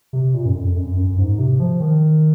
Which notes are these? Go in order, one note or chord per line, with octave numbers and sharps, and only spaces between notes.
C3
A#2
F#2
F2
F#2
F#2
G#2
C3
F3
D#3